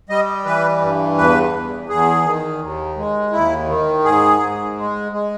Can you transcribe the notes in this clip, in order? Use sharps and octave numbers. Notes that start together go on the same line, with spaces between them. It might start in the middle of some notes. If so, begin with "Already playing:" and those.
G3 D#5
E3 B4
G2
E2 B4
E2
E2 G#4
D#3
D#2
G#3
D#2 E4
D#3
G#2 G#4
G#2
G#3
G#3